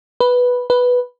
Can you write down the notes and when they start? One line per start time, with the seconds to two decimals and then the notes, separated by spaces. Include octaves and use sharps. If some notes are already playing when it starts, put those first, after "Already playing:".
0.20 B4
0.70 B4